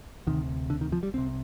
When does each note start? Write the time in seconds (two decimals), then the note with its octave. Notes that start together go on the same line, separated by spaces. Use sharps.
0.27 D2 C3 D#3
0.70 D3
0.81 D#3
0.92 F3
1.03 G3
1.14 C2 C3 C4